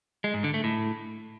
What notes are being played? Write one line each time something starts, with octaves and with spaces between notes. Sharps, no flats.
G#3
G#2
D3
A3
A2